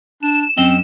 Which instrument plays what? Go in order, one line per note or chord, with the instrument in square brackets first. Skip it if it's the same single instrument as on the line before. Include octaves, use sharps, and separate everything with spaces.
[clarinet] D4 [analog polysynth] E7
[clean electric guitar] F#2 C#4 D#5 [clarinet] C4